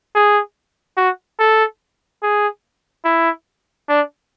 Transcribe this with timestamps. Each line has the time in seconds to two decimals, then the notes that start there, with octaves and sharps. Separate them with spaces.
0.15 G#4
0.97 F#4
1.39 A4
2.22 G#4
3.05 E4
3.88 D4